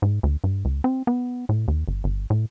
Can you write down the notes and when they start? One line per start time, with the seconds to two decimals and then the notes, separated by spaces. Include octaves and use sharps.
0.02 G#2
0.23 D2
0.44 G2
0.65 C#2
0.84 C4
1.07 B3
1.49 A2
1.68 D#2
1.87 G1
2.04 G1
2.30 A2